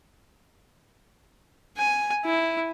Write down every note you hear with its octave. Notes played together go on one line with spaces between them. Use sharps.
G#5
E4